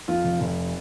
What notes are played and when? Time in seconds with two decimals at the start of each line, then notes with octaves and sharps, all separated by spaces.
0.08 F2 F4
0.24 F1
0.41 F1